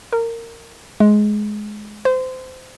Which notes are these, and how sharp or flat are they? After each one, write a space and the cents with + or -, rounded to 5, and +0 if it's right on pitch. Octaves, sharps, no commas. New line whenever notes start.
A#4 -20
G#3 +15
C5 -25